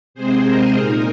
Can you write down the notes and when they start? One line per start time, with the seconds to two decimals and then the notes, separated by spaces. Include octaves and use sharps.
0.14 C3 G#3 C4 G#4 C5
0.45 A#4 D#5
0.77 A#2 A#3 D#4 A#4